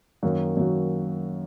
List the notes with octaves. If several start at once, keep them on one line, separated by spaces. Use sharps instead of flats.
F#2 D#3 A#3 F#4
F#2 D#3 A#3 F#4